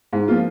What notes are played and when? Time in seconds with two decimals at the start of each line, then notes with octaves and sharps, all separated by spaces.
0.13 G#2
0.28 F3 A#3 F4